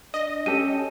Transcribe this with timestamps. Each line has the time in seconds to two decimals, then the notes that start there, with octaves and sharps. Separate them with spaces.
0.14 D4 D#5
0.46 C#4 G4 A4 D#7